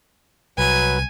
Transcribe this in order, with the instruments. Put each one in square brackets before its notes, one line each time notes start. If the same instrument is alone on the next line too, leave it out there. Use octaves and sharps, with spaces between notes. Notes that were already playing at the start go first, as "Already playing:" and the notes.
[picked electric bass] C2 [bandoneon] F#3 B4 [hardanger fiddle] G#5